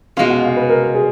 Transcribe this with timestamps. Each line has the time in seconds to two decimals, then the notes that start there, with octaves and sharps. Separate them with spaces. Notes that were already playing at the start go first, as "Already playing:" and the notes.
0.17 B2 G#3 C#4 F5
0.30 F#5
0.43 F5
0.56 B4
0.69 A#4
0.95 G#4